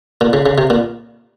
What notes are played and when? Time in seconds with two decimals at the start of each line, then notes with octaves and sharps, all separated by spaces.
0.21 A#2
0.33 C#3
0.46 C#3
0.58 C3
0.70 A#2